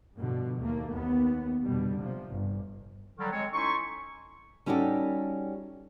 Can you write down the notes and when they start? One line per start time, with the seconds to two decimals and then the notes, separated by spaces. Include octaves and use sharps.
0.18 G2 B2 D3 F3
0.58 D#2 A3 A#3
0.91 D#2 B3
1.64 F1 B2 D3 G3
2.00 C3 F3
2.31 G1
3.18 D3 D#3 F#3 G3
3.31 G#3 C4 C#5
3.53 C#4 D#4 E4 A4 C6 C#6
4.66 G3 C#4 D#4 F#4 G4 A4